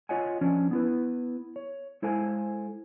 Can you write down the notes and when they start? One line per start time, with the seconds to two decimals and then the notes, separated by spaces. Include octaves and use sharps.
0.09 F4 C#5 D#5 F#5 G#5
0.41 F3 C#4 D4
0.71 B3 E4 B4
1.56 C#5
2.02 G#3 E4 A4 C5 F5 G#5